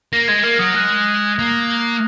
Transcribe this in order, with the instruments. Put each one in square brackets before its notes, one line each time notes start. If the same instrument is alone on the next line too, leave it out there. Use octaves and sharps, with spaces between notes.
[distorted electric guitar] A#3 [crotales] A#6
[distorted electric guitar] G#3 [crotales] G#6
[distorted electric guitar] A#3 [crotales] F6
[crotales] F6
[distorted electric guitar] F#3 [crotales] D#6
[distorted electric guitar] G#3 [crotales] F#6
[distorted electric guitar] A#3